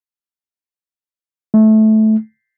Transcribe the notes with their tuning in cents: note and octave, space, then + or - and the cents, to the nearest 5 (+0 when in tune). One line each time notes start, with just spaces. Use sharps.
A3 -15